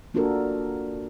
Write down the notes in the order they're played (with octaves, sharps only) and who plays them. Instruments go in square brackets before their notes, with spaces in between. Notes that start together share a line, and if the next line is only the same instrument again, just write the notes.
[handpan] A#3 D4 F4 F#4 A4 A#4